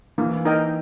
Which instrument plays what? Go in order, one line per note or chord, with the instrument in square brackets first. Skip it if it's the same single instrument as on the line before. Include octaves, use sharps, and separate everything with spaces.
[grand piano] E3 [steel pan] A#3
[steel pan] D#4 A#4 D#5 G5